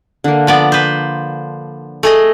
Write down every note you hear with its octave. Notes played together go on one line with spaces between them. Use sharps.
D3 A#3
F3 B3 D5
B4 C5
A3 G#4 D#5